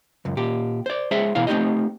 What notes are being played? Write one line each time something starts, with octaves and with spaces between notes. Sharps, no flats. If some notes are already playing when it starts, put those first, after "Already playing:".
C#2 F#2
A#2 G4
C5 D5
G#3 G#4 C5 E5
B2 E3 E4 D5 F5
A3 C4 D4 D#4 G4 D#5